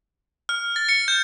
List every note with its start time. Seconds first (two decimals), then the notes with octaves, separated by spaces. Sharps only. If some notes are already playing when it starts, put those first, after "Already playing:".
0.49 F6
0.76 A6
0.89 C#7
1.08 G6